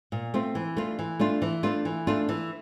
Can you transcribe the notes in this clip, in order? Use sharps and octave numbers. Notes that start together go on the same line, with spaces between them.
A#2
A3 C4 F4
E3
A3 D4 F4
E3
A3 D4 F4
E3
A3 D4 F4
E3
A3 D4 F4
E3